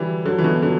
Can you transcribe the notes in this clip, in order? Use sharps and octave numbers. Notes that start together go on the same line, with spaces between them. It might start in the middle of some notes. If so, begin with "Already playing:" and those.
Already playing: D3 E3 F#3 G3
D3 F#3
E3
B2 D3
D3 F#3